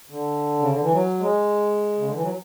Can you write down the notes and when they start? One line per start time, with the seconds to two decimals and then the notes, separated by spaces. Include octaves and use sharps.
0.10 D3
0.59 C#3
0.70 D3
0.81 E3
0.93 F#3
1.20 G#3
1.98 C#3
2.07 D3
2.15 E3
2.22 F#3